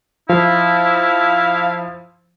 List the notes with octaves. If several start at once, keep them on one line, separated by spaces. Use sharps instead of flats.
F3 E4 F5